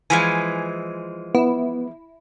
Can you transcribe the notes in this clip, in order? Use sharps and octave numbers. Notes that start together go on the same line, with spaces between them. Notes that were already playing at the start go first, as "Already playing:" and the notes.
E3 F3 G#3 G#5
B3 E4